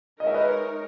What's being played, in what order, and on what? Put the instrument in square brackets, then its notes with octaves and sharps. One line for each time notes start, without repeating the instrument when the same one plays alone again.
[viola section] G#3 D#4 A#4 C#5 [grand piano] D#5
[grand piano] E5
B4 D#5